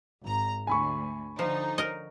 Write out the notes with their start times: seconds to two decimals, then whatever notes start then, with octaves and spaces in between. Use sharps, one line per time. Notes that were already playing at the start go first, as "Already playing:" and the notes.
0.23 G#1 A#5
0.67 D2 G#5 B5 C#6
1.39 D3 F3 D#4
1.78 A#4 D#5